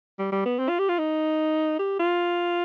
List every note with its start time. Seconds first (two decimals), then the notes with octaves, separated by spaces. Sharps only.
0.19 G3
0.32 G3
0.45 B3
0.59 C4
0.69 F4
0.79 G4
0.89 F4
0.99 D#4
1.79 G4
1.99 F4